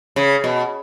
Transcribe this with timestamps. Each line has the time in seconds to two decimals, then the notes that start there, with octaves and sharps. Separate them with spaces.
0.16 C#3
0.44 B2